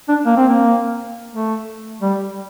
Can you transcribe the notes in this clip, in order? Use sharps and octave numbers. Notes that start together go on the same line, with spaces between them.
D4
A#3
C4
A#3
A3
G3